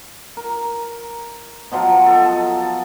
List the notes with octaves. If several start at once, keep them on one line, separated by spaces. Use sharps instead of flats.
A#4
B2 F3 F#3 F4
A4 D#5